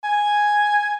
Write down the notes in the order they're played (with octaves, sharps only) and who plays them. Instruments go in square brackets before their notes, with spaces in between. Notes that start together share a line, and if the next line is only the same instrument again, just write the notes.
[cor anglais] G#5